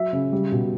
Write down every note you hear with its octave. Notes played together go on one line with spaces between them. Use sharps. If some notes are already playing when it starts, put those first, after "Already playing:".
Already playing: F#3 E5
C#3
G3
B2